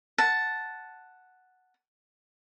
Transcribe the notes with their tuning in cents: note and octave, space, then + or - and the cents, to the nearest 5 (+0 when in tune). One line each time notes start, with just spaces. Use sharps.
F#5 +0 A5 +0